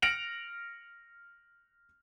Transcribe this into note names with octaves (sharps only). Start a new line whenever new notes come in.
F6 A#6 C#7 D7 F7 F#7